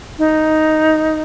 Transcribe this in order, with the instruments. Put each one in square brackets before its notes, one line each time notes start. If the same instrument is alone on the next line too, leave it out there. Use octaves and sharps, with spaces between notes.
[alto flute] D#4